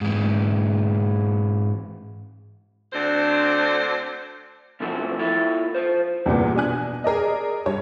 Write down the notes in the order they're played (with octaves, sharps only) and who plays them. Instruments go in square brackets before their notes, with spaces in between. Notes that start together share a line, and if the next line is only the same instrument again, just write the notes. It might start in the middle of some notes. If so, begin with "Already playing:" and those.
[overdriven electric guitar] G#2 E3
[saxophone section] D2 D3 C4 D4 C5
[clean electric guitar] B2 E3 F3 A3 C4 F#4
E4 F4 A4 E5
F4 C5
[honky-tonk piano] E2 G2 A#2 B3
B2 D4 G#5 F#6
G#4 A#4 D5 D#5
G2 C#5